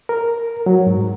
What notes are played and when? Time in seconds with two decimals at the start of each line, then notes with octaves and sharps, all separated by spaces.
0.09 A#4
0.66 F#3
0.87 G#2